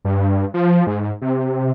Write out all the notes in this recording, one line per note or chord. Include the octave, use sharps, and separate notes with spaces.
G2
F3
G#2
C3